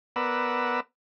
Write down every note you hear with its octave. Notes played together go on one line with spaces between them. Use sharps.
B3 A#4 B4 D5 F#5 E6